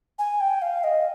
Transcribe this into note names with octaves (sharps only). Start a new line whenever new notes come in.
G#5
G5
F5
D#5